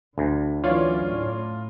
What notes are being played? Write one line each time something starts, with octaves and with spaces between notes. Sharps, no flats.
D2 D3
E3 F#3 C#4 F4 C#5 D5 F5
A2